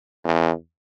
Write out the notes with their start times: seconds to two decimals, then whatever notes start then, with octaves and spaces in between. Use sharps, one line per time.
0.25 E2